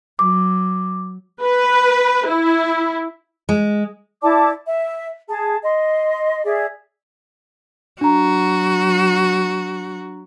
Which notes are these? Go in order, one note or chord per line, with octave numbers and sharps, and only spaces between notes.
F#3 D6
B4
E4
G#3
E4 D5 A5 D6
E5
G#4 A5
D#5 C6
G#4 D5 E5
F#3 D4 F#4 A#5